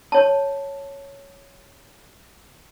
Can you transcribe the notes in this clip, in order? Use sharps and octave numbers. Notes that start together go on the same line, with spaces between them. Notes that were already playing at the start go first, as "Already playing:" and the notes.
C#5 A5